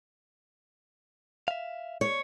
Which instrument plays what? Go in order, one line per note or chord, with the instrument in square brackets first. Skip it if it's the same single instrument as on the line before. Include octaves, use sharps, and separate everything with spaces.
[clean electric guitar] E5 F5
[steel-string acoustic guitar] C#5